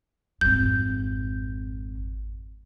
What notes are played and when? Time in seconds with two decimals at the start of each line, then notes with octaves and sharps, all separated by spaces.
0.41 G#1 F2 G6